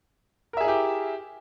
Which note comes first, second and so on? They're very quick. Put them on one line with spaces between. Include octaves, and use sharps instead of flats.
A#4 E5 G#4 E4 G4